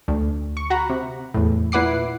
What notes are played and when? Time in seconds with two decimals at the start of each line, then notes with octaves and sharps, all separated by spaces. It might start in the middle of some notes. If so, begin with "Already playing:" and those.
0.08 D2
0.57 C#6
0.70 F#4 F#5 A#5 B5
0.90 C3
1.34 E2 A2
1.72 A#2 E4 B4 F#5 D6 C7